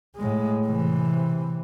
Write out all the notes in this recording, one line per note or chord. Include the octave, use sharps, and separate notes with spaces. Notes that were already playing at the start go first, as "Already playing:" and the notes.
A2 G#3
C3 E3